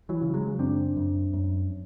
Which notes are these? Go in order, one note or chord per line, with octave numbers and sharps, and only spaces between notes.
E3 F#3
C#3
F#3 G#3
F#2 C4 D4
F#2
F#2